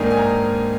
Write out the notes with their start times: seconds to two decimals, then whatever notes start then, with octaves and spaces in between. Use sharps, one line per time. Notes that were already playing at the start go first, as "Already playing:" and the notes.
Already playing: G#2 D#3 A#3 D4 G#5
0.10 G#5
0.17 A#5